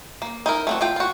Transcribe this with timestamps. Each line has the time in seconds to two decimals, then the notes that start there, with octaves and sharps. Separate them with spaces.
0.22 A#3
0.46 D#4 E4 A#4
0.67 A3 C4 F#4
0.81 A3 F4 G5
0.96 F4 F#4